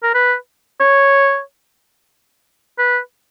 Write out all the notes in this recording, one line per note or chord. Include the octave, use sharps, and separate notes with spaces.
A#4
B4
C#5
B4